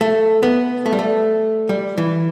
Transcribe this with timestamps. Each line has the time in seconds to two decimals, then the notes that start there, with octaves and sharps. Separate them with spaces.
0.01 A3
0.43 B3
0.86 A3
0.93 G3
0.99 A3
1.69 G3
1.98 E3